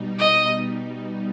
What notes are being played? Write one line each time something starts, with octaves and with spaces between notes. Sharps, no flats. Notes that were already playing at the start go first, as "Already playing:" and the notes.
Already playing: B2 G3 D#4
D#5